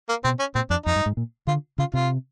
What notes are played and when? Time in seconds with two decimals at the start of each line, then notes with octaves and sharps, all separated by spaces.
0.09 A#3
0.24 B2 C4
0.39 C#4
0.55 A#2 C4
0.70 F2 D4
0.86 F2 D#4
0.96 G2
1.06 G#2
1.17 A#2
1.47 D3 F4
1.78 C#3 F4
1.94 C3 F4